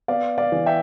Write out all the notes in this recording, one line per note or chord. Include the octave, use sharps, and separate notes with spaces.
B3 D5 F5
D5 F5
E3
E5 G5